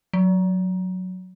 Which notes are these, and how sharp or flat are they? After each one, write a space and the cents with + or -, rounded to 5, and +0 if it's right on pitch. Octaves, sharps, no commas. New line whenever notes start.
F#3 -10